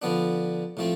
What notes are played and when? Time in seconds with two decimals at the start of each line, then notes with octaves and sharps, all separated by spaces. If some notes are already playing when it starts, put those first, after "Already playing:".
0.02 D3 F3 B3 D4
0.77 A2 F3 A3 C4